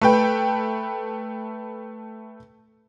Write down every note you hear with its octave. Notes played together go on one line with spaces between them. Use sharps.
A3 B4 G5